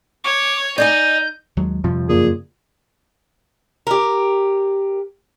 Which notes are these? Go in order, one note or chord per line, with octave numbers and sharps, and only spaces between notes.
C#5 C#6 D6
D#4 D5 D#5 G#5 G6
D#2 F#3 G#3
F2 C3 F3 G3
F#2 A#2 C#3 G#4
G4 A#4